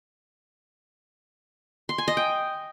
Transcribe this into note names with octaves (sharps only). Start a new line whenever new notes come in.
C6
G#5
D#5
G5